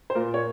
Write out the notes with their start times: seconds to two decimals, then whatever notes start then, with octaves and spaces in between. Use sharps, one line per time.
0.10 C5
0.15 A#2 A#4
0.34 C#5